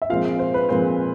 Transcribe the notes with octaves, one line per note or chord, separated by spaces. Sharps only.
E5
A#2 F3 G#3 C4 F4 F5
C5
B4
A#2 F3 G#3 C4 C5